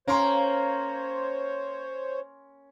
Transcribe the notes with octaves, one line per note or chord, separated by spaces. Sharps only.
A#3 C#4 C5 C#5 C6